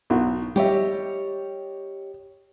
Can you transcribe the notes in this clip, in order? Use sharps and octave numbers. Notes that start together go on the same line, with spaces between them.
B1 F#4
G3 G4 C#5 D#5 E5